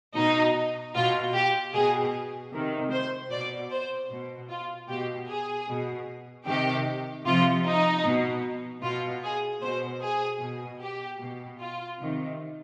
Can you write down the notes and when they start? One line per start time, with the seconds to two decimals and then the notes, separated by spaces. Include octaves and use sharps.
0.16 B2 D#4
0.95 B2 F4
1.34 G4
1.74 B2 G#4
2.52 C3 D#3
2.92 C5
3.31 B2 D5
3.72 C5
4.10 B2
4.49 F4
4.89 B2 G4
5.28 G#4
5.68 B2
6.46 C3 D#3 G4
7.26 C3 F3 F4
7.66 D#4
8.04 B2
8.83 B2 F4
9.23 G#4
9.62 B2 C5
10.01 G#4
10.41 B2
10.81 G4
11.20 B2
11.60 F4
11.99 C3 D#3